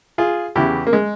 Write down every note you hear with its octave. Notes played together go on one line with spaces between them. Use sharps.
F4 G#4
E2 C#3 E3 E4 G4
A#3
G#3